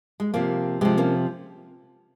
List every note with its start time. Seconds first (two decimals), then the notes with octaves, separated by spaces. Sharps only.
0.20 G#3
0.34 C3 F3 A#3
0.81 C3 F3 G#3 C4
0.98 A#3 C#4